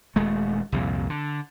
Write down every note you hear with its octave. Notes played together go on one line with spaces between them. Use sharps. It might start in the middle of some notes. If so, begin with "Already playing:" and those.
D#1 G#3 A3
C2 F2 A#2
D3